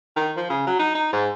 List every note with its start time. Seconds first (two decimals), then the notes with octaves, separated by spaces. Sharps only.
0.16 D#3
0.37 F3
0.50 C#3
0.67 F#3
0.79 D#4
0.95 D#4
1.13 G#2